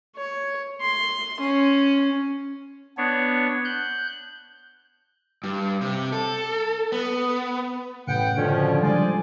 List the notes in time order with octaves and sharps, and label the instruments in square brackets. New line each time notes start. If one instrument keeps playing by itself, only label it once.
[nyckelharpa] C#5
C6
C#4
[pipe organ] B3 D4 C#5
F#6 G6
[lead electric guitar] G2
C3
A4
B3
[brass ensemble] A1 B3 B4 [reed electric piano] F#2 A2 C#3 [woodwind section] F#5 G5
[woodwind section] B2 D#3 C#4 [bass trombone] D3 [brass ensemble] F3
[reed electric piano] F3 G3 G#3 [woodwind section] D#4 F4 D5 [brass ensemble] C5 G#5